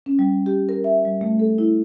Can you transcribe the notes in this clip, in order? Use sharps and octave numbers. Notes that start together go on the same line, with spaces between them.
C#4
G3
G4
A#4
E5
G3
A3
A4
E4